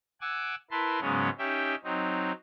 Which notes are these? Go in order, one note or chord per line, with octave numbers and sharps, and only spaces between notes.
F#5 G#5 D6 E6
E4 A#4 B4 A5 C6
G#2 C#3 F#3 G#3 B3 C#4
C#4 D#4 G4 E5 G5
F#3 C4 D#4